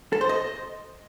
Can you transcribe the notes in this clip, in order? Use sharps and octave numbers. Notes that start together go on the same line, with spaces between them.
A4
C5
D#5